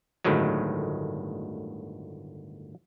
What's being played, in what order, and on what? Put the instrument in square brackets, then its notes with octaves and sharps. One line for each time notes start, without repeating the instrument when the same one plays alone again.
[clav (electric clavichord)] G1 D2 A2 D#3 F#3 G#3